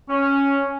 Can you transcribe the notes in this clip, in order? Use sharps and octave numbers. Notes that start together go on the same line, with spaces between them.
C#4